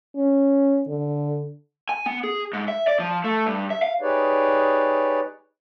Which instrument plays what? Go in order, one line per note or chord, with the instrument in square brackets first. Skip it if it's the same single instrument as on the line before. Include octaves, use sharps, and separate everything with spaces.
[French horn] C#4
D3
[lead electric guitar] G#5
B3
G#4
G#2
E5
D5
F3
A3
G2
E5
F5
[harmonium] D#4 G4 G#4 B4 C#5 D5